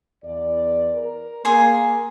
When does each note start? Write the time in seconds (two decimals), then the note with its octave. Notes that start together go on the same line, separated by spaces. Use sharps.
0.24 E2 D5
0.95 A#4
1.45 A#3 G#4 G#5 C6